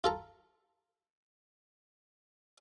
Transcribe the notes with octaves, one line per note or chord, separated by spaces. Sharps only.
F4 A4 A#5